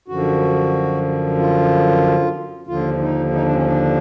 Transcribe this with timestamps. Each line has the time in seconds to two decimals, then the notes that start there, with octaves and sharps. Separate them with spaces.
0.08 F#2 D3 F3 F#4
1.38 F4
2.67 D#2 D3 F3 F4
3.00 D#4
3.32 D#4
3.43 D4
3.55 C#4
3.66 D4